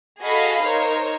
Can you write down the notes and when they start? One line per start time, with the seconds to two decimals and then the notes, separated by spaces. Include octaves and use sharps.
0.21 F#4 G#4 A4 D#5 F5 B5
0.63 D#4 A#4 C5 C#5